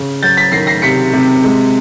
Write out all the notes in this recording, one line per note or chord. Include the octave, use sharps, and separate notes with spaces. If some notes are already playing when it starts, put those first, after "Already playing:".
Already playing: C#3
F#3 G6 A6
A6 B6
D#3 A#6 C7
A#6 C7
C3 B6 C#7
C3
G#3